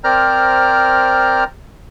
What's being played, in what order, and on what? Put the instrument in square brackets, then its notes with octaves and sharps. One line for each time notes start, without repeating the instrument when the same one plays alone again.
[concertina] C4 A#4 C5 D5 A#5 F6